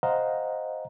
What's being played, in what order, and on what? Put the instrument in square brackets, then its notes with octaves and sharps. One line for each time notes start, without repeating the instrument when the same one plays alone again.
[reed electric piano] C5 D#5 F5 F#5 A#5